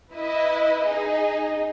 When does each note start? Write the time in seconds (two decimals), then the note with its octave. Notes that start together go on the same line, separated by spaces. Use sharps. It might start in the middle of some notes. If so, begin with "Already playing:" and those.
0.13 E4 B4 D#5
0.84 D#4 G#4 D#5